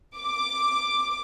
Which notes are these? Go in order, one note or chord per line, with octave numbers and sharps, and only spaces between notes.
D6